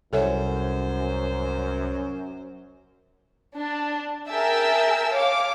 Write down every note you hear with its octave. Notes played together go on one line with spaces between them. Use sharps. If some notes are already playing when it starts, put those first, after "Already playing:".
C2 F#2 A4 C5 C#5 E5 F#5 G#5
D4
G#4 A#4 E5 G5 A5 E6
C#5 F5 D6